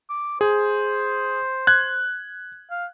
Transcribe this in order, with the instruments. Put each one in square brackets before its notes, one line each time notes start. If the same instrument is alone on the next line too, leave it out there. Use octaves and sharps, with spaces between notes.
[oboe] D6
[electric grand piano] G#4 [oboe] C5
[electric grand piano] F#6 G#6
[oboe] F5